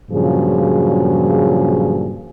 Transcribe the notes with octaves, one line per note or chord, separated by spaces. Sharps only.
G2 A#2 C#3 F3 F#3 G#4